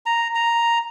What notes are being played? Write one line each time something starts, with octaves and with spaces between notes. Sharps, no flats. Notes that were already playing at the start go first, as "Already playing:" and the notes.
A#5
A#5